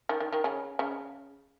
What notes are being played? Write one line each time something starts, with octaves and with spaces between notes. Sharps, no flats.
D#3
D#3
D#3
C#3
C#3